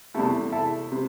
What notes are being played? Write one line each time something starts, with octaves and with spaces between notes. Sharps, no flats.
E2 C3 A3 E4 A4
E4 A4
C3